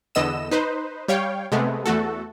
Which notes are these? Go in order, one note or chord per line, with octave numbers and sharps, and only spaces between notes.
E2 D3 B3 D#5 E6 E7
D#4 B4 C5
G3 C#5 F5 G5
C3 G#3 A3 B3
E2 A3 F#4 A4